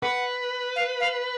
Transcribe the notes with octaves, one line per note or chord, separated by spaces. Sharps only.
B4 F#5
F5
F5